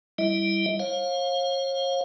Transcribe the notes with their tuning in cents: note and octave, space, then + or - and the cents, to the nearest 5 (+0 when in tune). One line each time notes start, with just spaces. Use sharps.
G3 +0 E4 +0 D#5 +40
C#5 -45 F5 +20